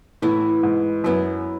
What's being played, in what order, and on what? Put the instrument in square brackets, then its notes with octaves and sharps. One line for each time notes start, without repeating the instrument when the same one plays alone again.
[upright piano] A2 [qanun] E3 B3 E4
[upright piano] G#2
[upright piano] F#2 [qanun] F#3 B3 E4